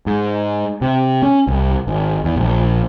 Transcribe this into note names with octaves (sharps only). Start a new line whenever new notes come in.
G#2
C3
C#4
C2
G#1
E2
A#1